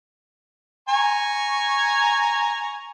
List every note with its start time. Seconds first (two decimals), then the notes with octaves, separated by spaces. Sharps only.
0.89 G#5 A#5 C#6